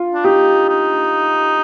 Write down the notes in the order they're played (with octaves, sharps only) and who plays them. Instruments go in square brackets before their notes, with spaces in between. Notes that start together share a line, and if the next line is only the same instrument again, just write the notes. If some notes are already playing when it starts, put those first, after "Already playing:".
Already playing: [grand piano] F4
[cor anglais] D4
[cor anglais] D#4 [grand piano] G4
[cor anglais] D#4